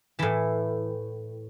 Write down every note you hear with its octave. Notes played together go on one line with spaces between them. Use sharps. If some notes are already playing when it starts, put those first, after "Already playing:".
A2 E3 A5